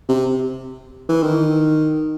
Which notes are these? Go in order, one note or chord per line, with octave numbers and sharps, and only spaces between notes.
C3
E3
D#3